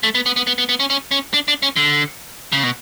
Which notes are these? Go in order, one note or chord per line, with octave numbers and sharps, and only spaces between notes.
A3
B3
B3
B3
B3
B3
B3
C#4
C#4
C#4
D4
D4
C#4
D3
C#3
B2